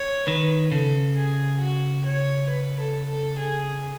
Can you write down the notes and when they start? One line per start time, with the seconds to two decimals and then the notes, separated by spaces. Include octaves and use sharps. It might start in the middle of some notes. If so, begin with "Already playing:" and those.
Already playing: C#5
0.28 D#3 B4
0.72 C#3 A4
1.17 G#4
1.61 F#4
2.05 C#5
2.49 B4
2.80 A4
3.09 A4
3.38 G#4